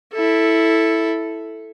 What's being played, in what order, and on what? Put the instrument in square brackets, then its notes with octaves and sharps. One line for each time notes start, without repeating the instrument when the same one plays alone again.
[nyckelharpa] E4 A4